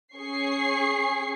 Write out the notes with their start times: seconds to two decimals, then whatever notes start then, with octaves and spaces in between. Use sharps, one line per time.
0.16 C#4 G#4 C#6 C7